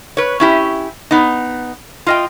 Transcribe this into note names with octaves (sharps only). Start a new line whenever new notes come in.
B4 C#5
C#4 E4 G4
B3 D#4
F4 D#5 G5